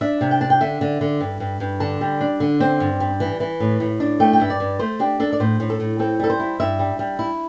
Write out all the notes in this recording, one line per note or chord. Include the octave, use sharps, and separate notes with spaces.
D4 E5
C3
G5
D4 A5
G5
D3 E5
D3
D3
G2
G2
G2
D3 A5
G3
D4
D3
C4
G2
G3
E3
E3
A2
A2
D4
A3 G5
G5
G2 E5
D5
G2
A3 C5
D4 G4
D4 A4
D5
A2 C5
A2
A4
A2
C4 A4
G3 A4
C5
E4
G2 E5
G3
G3
E4